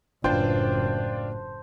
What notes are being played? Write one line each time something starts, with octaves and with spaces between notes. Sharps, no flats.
F#1 A2 D4 F4 C5 G5 A5